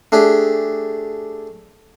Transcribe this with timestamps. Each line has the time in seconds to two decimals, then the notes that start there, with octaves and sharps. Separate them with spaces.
0.12 A3 D4 G4 G#4